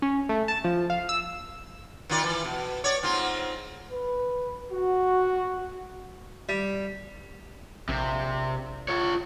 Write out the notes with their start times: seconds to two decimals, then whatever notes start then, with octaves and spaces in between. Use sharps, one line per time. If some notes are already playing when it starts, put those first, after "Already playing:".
0.02 C#4
0.29 A3
0.48 A5
0.64 F3
0.90 F5
1.09 E6
2.10 D#3 F4 D5
2.24 E3
2.44 B2
2.84 C#5 D5
3.03 G#2 C4 F4
3.91 B4
4.71 F#4
6.49 G3
7.89 A#1 C3
8.88 F4 C#5